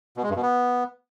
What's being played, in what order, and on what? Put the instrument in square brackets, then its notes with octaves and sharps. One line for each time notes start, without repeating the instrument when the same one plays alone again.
[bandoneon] B2
G#3
G2
B2
B3